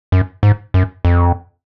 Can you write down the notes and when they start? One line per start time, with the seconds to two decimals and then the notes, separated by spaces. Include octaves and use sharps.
0.12 F#2
0.43 G#2
0.74 F#2
1.05 F2